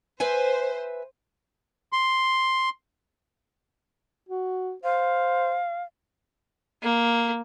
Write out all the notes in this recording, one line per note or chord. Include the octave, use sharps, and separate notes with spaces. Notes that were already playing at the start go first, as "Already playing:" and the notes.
B4 C5 E5 G#5
C6
F#4
C5 F5
A#3